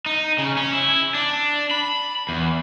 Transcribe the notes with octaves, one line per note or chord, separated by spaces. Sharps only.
D#4
C#3
C#4
E4
D4
B5
E2